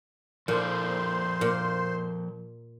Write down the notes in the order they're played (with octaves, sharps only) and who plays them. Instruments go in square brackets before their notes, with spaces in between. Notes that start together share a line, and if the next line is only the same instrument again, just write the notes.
[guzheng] A#2 [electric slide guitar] F3 A4 D5 [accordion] C5 C6
[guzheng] A#2